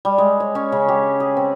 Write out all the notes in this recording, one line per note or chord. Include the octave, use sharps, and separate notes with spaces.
G3
G#3
C#5
C#4
C#3
G4
G#4
C4